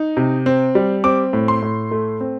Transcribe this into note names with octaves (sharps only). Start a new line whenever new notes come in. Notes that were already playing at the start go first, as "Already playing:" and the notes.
Already playing: D#4
C3
C4
G3
C4 D6
A2
C6
A2
A3
C4